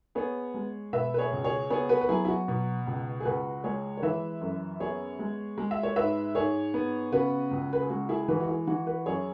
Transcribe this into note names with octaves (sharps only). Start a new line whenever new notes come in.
B3 G#4 C#5
G#3
B2 B4 E5
B4
G#4 C#5
C#2
G#4 C#5
B3 G#4 C#5
F#4 B4
B4
F#3 E4 G#4
E4
F#4
B2
C#2
G#4
C#2 F#4 B4
G#3 G#4 C#5
C#5
E3 B4 E5
F#2
B3 G#4 C#5
G#3
G#3
E5
C#5
G#2 B4 E5
G#2 G#4 C#5
B3
C#3 F#4 B4
C#2
B4
G#4
G#3 F#4
E4 G#4
E3 F#4 B4
F#4
E4 G#4
E3 F#4
F#4 B4
F#2 G#4 C#5